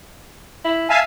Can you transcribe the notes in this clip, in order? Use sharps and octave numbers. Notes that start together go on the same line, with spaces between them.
E4
E5 F5 G#5 A5